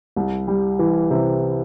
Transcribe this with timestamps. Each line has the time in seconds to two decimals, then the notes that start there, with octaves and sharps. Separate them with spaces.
0.16 C2
0.48 G3
0.79 E3
1.11 C3